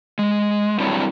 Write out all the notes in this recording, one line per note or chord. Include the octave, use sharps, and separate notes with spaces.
G#3
F#3 G3 C4 D4 E4 C#5